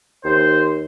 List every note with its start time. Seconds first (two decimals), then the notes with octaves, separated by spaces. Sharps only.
0.24 D#2 C5